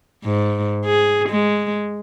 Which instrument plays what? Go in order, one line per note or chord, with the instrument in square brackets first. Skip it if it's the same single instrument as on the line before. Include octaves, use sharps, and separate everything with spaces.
[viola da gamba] G#2
G#4
G#3